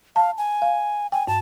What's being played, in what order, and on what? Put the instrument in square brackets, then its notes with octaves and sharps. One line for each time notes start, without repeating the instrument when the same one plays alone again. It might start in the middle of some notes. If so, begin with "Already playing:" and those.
[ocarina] F5 [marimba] A5
[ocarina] G#5
[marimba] F5
[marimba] G5 [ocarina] G#5
[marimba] G2 [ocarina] A5